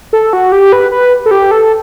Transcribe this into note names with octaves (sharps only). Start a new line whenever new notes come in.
A4
F#4
G4
B4
B4
A4
G4
A4